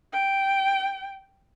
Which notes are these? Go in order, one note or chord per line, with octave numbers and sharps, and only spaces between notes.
G5